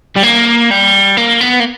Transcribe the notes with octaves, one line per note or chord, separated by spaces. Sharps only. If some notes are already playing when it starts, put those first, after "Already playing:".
G3
A#3
G3
A#3
B3
A#3